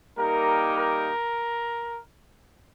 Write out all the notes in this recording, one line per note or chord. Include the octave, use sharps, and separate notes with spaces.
G3 A#3 D#4 G4 A#4
A#4